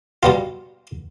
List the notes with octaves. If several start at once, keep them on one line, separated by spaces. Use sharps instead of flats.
B2 G3 B3 F4